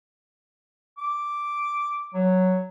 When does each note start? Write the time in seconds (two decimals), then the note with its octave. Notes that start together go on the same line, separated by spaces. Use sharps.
0.98 D6
2.14 F#3